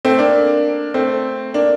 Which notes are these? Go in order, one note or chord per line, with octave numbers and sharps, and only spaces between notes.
A3 C4
A#3 D4
A3 C4
A#3 D4